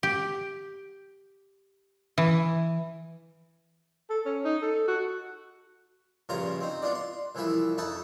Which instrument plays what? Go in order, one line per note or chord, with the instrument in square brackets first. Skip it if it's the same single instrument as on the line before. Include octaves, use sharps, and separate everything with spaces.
[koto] G4
E3
[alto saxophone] A4
C#4
D#4
A4
F#4
[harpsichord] A#1 G2 C#3 F4 A#4 A#5
C4 D#4
B3 D4 F4 D5
C6
C2 E3 F3 B4 E5
F2 D#4 B4 E5 A5